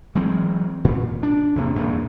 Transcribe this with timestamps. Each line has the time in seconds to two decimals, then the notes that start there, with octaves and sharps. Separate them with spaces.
0.15 E3 F#3 G#3 C4
0.84 A#2
1.23 D4
1.56 E2 C3 A#3
1.76 E2 G2 A#2